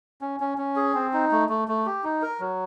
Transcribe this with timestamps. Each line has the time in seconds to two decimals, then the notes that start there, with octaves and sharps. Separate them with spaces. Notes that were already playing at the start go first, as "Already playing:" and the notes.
0.21 C#4
0.40 C#4
0.58 C#4
0.76 G#4
0.94 C4
1.13 D#4
1.31 A3
1.49 A3
1.68 A3
1.86 G4
2.04 D#4
2.22 A#4
2.40 F#3